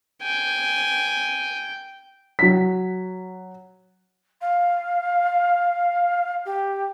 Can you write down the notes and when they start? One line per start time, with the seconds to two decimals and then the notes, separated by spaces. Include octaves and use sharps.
0.23 G5 G#5
2.39 F#3 B6
4.41 F5
6.45 G4